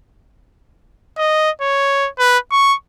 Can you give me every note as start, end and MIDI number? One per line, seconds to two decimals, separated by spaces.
1.18 1.50 75
1.61 2.09 73
2.19 2.38 71
2.51 2.75 85